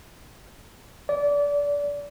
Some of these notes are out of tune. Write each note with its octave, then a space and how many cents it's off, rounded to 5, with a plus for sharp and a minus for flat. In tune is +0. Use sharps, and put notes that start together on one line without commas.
D5 -25